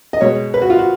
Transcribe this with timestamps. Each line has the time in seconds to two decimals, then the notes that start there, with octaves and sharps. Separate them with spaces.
0.13 D#5
0.21 B2 G#3 C#5
0.54 B4
0.62 F#4
0.70 F4
0.79 F#4